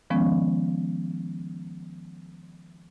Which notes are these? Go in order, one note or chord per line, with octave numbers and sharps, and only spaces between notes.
D#3 F3 G#3 B3 C#4